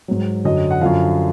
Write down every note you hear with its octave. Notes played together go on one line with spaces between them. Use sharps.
G#2 F#3
F#2 D3 F#3 D#5
F#5
F#2 D3 F3 F5